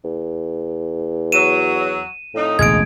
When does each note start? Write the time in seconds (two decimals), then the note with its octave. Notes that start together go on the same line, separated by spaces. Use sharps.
0.04 E2
1.32 F#3 D#7 E7
2.34 F2 A2 D#4
2.59 E1 A1 D2 G#3 G#6 D7